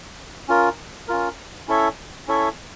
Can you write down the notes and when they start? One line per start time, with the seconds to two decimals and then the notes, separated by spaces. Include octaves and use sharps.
0.48 C#4 F4 A#4
1.08 C#4 F4 A#4
1.68 C#4 E4 A4 C#5 E5
2.27 C#4 E4 A4 C#5 E5